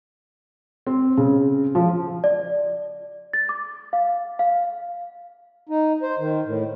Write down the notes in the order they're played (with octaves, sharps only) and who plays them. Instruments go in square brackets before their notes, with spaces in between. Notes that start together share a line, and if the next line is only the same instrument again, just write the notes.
[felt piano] C4
C#3
F3
[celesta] D5
A6
D6
F5
F5
[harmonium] D#4
C5
D#3
A2